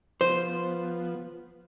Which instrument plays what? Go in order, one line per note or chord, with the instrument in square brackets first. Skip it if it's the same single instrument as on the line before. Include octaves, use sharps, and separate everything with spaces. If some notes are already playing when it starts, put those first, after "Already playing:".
[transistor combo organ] F3 B3 [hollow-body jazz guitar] C5